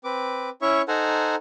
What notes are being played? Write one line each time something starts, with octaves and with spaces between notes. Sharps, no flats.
C4 B4 D6
C#4 E4 C#5 E5 C#6
D#4 A4 C5 F#5 G#5 A#5